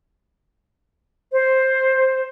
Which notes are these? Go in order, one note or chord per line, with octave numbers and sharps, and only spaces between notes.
C5